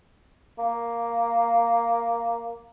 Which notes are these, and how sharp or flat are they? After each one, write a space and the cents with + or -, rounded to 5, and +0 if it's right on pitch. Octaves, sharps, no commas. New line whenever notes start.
A#3 +0